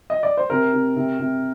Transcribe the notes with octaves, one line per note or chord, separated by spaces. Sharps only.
D#5
D5
C5
C3 A#4
C3
C3
C3